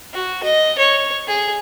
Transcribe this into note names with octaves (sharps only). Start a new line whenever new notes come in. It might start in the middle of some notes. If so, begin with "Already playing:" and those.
F#4
D#5
C#5
G#4